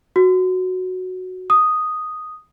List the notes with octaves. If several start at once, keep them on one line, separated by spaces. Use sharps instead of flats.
F#4
D#6